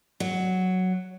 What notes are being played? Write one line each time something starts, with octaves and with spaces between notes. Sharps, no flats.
F#3